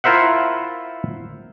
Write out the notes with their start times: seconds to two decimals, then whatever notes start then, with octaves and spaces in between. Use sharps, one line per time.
0.04 E4 F4 A#4 C5 E5 F#5